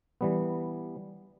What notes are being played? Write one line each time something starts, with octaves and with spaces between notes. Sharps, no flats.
E3 G3 B3